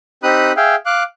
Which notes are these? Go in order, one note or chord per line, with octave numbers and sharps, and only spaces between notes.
C4 D#4 G4 B5 D#6 F#6
G#4 E5 F5 G5
F5 D6 F#6